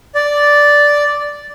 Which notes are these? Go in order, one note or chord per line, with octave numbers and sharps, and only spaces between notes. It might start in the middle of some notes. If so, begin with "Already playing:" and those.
D5